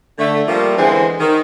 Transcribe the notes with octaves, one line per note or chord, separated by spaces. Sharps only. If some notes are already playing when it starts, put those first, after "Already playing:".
D3 A3
F3 G3 A3 A#3
D3 E3 G#3 B3 C4
D#3